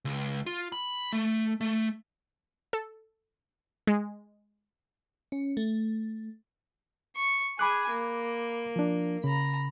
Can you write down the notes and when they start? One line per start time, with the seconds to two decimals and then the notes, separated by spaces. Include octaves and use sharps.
0.05 C#2
0.46 F4
0.72 B5
1.13 A3
1.61 A3
2.73 A4
3.87 G#3
5.32 C#4
5.57 A3
7.16 C#6
7.59 G#4 G#5 B5 D6 F#6
7.90 A#3
8.76 F3 D4
9.24 C#3 A#5 B5